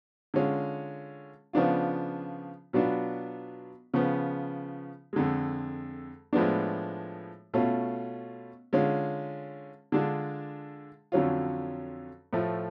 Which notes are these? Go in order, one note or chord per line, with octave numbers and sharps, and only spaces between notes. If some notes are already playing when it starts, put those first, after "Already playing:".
D3 G#3 C#4 F4
C#3 F3 B3 D4 F4
B2 F#3 B3 D4 F4
C#3 F3 B3
F2 D3 G#3
A2 F3 G#3 B3 D4
B2 A3 C#4 F4
D3 G#3 C#4 F4
D3 G#3 D4 F4
F2 D3 F#3 C#4 F4
A2 F3 A3